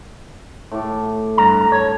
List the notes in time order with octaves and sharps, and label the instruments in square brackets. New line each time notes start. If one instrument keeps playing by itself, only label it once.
[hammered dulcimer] A2 D6
[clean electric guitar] G2 A#5
[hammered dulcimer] A4 [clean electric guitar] C#5